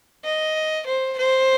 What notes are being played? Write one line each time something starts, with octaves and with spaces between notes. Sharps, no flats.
D#5
C5
C5